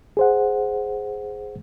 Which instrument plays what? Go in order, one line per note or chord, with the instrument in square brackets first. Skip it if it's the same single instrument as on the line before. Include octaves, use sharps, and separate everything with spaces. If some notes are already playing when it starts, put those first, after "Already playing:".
[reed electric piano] G#4 C5 F#5